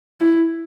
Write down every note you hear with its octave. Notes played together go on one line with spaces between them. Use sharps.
E4